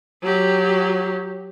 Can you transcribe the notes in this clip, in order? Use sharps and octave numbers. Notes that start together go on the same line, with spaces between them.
F#3 G4